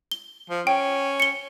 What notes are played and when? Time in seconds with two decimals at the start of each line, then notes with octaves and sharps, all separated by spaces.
0.11 G7
0.50 F3
0.67 C#4 G5
1.20 C#7 G7